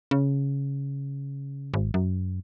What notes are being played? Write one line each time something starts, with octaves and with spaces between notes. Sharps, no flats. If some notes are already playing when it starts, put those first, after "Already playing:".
C#3
G#1
F#2